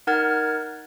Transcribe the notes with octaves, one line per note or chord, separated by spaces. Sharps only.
D#4 A#4 F#5 F6 G#6 A6